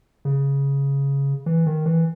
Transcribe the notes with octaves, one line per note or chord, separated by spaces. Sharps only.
C#3
E3
D#3
E3